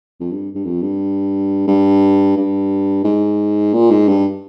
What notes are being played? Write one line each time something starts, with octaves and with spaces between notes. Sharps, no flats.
F2
G2
G2
F2
G2
G2
G2
G#2
A#2
G#2
G2